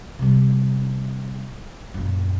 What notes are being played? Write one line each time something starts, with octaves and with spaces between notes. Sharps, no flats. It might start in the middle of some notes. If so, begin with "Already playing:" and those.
C3 G3
F#2 A#2